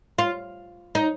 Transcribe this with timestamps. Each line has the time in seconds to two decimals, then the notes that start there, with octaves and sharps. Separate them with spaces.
0.19 F4
0.95 D#4